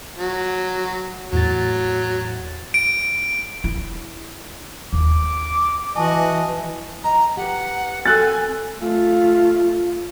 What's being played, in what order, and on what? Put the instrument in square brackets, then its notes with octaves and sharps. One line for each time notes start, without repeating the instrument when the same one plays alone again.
[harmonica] F#3
[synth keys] E2 A2 A6 [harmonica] F#3
[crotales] D7
[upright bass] E4
[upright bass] D#2 [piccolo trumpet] D6
[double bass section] E3 [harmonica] F#4 D#5 [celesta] G#5 A5
[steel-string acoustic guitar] D#5 G#5 [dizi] A#5
[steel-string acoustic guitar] G4 B4 [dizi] F#5
[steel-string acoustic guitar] C4 A4 A#4 [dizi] G#5 [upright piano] E6 F#6 A6
[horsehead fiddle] A3 F4